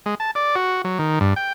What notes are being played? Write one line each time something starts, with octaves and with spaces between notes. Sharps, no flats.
G#3
A5
D5
F#4
F#3
D#3
G2
G5